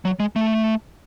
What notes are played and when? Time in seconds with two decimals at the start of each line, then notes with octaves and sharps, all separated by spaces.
0.05 F#3
0.20 G#3
0.36 A3